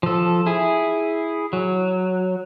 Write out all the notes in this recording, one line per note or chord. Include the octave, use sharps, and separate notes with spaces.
F3 A4
E4 G#4
F#3